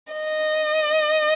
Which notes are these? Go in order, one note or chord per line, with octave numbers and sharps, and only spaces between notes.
D#5